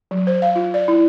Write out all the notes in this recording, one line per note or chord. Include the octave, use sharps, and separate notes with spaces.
F#3
C5
F5
F4
D5
E4